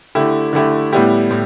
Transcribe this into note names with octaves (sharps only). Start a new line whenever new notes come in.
D3 A3 E4 G4
D3 A3 E4 G4
A2 G3 B3 E4 G4
A2